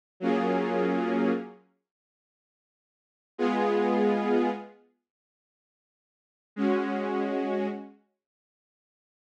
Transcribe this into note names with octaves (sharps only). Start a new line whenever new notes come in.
F#3 A#3 C#4 F4 G#4
G#3 B3 F4 G#4
G#3 C#4 F#4